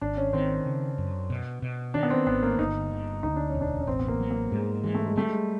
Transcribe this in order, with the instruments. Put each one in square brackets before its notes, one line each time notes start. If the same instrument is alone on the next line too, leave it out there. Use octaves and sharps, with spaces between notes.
[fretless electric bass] G#1 [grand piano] D4
[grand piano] C#4
[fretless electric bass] D#3 [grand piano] C4
[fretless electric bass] C#3
F#2
B2
B2
[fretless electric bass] D#3 [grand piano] D4
[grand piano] B3
C4
[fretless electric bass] G#1 [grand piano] B3
[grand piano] A#3
[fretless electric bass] G1 [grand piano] D#4
[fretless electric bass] D3
[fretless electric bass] D2 [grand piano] D#4
[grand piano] D4
C#4
[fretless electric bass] E1
[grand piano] D4
C#4
[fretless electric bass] A1 [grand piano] C4
[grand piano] B3
A#3
[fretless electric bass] F#3
[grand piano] A#3
[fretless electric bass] G#2 [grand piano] G#3
[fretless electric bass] E3 [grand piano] G#3
[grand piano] A3
G#3
[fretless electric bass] G3 [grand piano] A3
[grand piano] G#3